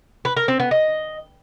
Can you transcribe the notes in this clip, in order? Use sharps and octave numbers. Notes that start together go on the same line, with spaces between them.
B4
A#4
C4
B3
D#5